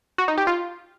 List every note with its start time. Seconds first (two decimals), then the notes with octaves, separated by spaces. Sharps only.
0.18 F#4
0.28 D#4
0.37 G4
0.47 F4